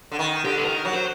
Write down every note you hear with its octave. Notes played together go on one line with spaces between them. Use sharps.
D3
D#3
D3 G4
A4
D#3 A#4
F#3
C5